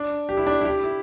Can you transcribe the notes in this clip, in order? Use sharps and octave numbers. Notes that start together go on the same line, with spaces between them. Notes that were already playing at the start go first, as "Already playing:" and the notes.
Already playing: D4
G4
E4
D4
E4
G4
E4